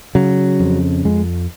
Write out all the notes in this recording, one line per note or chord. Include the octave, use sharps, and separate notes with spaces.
C#3 F#3
F2
F2 G#3